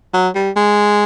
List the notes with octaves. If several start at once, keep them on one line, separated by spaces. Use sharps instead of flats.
F#3
G3
G#3